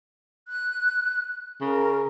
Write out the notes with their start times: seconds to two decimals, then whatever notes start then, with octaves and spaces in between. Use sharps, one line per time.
0.48 F#6
1.61 C#3 A#4